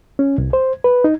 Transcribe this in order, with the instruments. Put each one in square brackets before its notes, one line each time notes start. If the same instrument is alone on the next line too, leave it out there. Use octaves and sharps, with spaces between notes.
[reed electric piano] C#4
C2
C5
B4
D#4